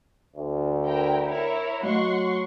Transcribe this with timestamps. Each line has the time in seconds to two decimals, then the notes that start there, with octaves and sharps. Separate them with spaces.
0.36 D2
0.85 E4 A#4 G5
1.26 E4 A#4 C#5
1.83 F#3 A3 D#5 F#5 C6 C#6